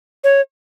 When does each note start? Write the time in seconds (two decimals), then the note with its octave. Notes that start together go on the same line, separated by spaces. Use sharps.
0.24 C#5